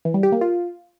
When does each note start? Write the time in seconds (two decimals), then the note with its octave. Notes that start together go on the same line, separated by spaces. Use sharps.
0.05 E3
0.14 G3
0.23 G4
0.32 A#3
0.41 F4